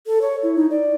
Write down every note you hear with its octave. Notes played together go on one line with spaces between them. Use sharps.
A4
C#5
E4
D#4
D5